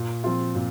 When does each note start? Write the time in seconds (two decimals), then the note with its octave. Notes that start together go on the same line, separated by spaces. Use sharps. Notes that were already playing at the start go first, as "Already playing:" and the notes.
Already playing: A#2
0.24 F3 C4 F4
0.55 A#2